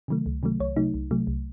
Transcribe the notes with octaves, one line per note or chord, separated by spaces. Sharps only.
C3 D#3 F#3 A3
C#2
C3 D#3 F#3 A3
C2 C#5
C3 F#3 A3 D#4
C2
C3 F#3 A3
C2